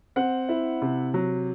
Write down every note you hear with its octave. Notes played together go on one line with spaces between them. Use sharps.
C4 F#5
E4
C3
F#3